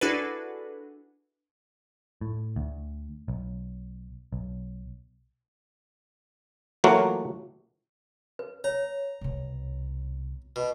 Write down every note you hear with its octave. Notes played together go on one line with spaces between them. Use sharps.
D4 E4 F#4 G#4 A4 B4
A2
D2
B1
B1
E3 F#3 A3 A#3 F4 F#4
B4
C#5 A#5
C2 B2
B2